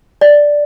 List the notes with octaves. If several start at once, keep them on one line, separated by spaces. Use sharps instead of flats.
D5